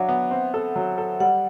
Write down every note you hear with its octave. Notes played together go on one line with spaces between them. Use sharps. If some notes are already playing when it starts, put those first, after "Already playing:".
Already playing: F#3 D4 E5 F#5
B3
C4
A4
F#3
A4
G3 F#5